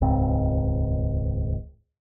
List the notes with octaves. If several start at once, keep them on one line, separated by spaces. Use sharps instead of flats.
D#1 C#2 G#2 C4